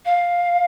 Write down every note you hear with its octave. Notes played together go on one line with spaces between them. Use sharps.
F5